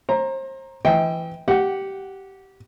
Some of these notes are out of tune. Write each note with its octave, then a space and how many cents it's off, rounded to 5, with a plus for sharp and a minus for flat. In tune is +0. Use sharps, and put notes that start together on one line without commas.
C5 +35 A#5 +0
E3 +20 D#5 +45 G5 +0
G4 -15 F#5 +0